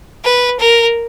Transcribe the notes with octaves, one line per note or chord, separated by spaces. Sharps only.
B4
A#4